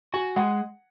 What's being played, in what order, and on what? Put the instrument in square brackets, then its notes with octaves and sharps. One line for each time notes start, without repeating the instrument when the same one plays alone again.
[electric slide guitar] F#4 [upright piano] G#5
[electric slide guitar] G#3 [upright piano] F#5